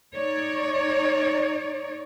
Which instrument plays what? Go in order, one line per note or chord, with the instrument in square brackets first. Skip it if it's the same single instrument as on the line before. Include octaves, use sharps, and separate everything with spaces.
[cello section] D#4 C#5 D5